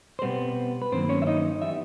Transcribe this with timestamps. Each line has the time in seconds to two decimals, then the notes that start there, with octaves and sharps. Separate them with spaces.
0.19 C5
0.22 B2 G3 B3 C4 B4
0.82 B4
0.92 G2 D#3 F#3 A#3 C4 C5
1.09 C#4 C#5
1.22 E5
1.27 D#4 D#5
1.62 E3 G3 B3 E5